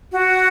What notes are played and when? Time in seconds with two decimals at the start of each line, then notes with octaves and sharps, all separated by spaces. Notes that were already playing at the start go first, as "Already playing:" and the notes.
0.12 F#4